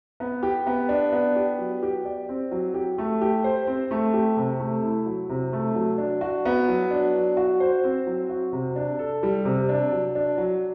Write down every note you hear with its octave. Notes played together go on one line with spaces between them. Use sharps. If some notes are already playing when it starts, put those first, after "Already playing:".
B3
G4
B3
D4
B3
G4
F#3
G4
D5
C4
F#3
G4
A3
G4
C5
C4
A3
G4
C3
A3
E4
F#3
C3
A3
F#3
D4
F#4
B3
F#3
D4
F#3
F#4
C5
C4
F#3
F#4
C3
D4
A4
G3
C3
D4
F#3
D4
F#3